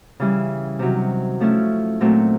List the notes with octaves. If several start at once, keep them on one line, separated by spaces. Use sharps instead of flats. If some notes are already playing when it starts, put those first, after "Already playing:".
C#3 E3 G3
C3 D#3 F#3
F3 A3 C#4 E4
A#2 F#3 A3 C4